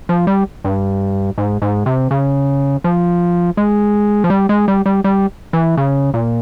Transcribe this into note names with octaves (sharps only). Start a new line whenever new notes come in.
F3
G3
G2
G#2
G#2
C3
C#3
F3
G#3
F3
G3
G#3
G3
G3
G3
E3
C#3
A#2